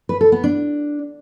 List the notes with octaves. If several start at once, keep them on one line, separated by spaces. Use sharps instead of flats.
B4
A4
B3
D4